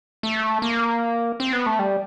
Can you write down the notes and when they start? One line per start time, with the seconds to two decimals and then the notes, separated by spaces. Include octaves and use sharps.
0.23 A3
0.62 A#3
1.40 C4
1.53 B3
1.66 A3
1.79 G3